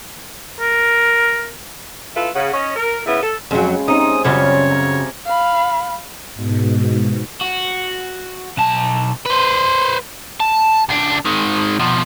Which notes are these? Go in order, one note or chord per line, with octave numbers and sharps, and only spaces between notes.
A#4
E4 F4 A4 B4
C#3 F#5
C#4 D#5
A#4
C#3 B3 E4
A4
F2 C#3 F#3 G#3 G5
C3 C#4 D#4 D#6
F#2 C#3 G3 C#4 F4 C#5
A#5
F5 B5
G#2 B2
F#4
B1 A5
B4 C5
A5
C#2 D4
D#3 G#3
B2 F3